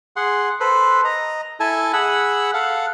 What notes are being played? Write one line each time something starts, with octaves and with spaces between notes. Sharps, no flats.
G#4 F#5 C6
A4 B4 C5
D#5 A#5
E4 A4 G#5 A5
G#4 F#5 B5 E6
A4 F5 F#5